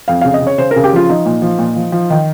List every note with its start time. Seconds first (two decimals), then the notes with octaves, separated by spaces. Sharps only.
0.08 F2 F5
0.21 C#3 F5
0.34 D#5
0.41 C#3
0.47 C#5
0.58 C#3 C5
0.71 A#4
0.76 C#3
0.84 G4
0.92 F3 F4
1.10 F3 D#4
1.26 A#2
1.42 F3
1.59 A#2
1.76 F3
1.92 F3
2.10 D#3